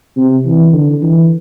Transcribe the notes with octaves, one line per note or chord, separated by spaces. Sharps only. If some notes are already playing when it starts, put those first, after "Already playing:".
C3
E3
D3
E3